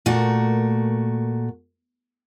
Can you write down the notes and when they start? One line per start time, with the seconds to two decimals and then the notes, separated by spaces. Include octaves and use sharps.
0.06 A#2 A3 F#4 A#4